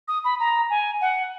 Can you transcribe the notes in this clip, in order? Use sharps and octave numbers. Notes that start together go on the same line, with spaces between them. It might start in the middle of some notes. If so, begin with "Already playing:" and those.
D#6
B5
A#5
G#5
F#5